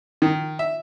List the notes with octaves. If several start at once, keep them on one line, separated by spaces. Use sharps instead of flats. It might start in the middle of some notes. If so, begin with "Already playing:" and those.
D#3
E5